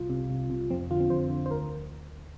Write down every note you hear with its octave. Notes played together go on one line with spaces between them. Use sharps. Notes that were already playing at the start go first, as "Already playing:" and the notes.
Already playing: C2 F4
C3
C2
C3
F2 C4
D3 F4
C4
F2 C5
D3
C5
D2 A#4